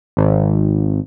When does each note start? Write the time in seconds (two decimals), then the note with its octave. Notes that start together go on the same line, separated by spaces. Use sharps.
0.17 G#1